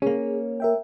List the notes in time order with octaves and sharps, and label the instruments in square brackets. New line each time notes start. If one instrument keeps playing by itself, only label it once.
[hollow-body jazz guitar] A#3 C#4 [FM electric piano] G#4
[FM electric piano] A#4 E5 G5